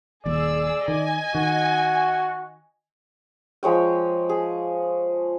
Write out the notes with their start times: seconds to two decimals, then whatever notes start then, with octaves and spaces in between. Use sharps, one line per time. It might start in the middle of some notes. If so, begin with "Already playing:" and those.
0.26 D#1 D#2 G#4 D5 E6
0.88 D#3 D#5 G#5
1.35 D#3 F#4
3.63 F3 G#3 C#5 G5
4.29 G#4